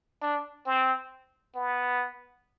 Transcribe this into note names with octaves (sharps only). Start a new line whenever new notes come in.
D4
C4
B3